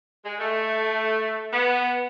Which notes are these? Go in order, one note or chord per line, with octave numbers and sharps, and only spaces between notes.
G#3
A3
B3